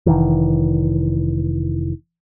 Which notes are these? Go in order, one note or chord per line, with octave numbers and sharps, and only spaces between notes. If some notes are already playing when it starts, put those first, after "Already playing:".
F1 E2 D#3 E3